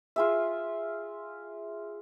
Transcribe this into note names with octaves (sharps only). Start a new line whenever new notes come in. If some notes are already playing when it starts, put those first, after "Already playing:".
F4 G#4 E5